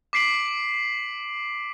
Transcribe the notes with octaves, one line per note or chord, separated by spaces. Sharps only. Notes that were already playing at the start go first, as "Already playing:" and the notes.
D6 B6 C7 D7 F#7